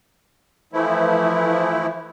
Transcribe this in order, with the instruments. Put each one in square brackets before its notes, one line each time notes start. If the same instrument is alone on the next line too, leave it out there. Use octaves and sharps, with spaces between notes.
[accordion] E3 F3 A3 E4